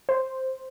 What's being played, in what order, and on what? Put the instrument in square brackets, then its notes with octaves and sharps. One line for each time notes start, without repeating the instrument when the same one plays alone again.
[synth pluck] C5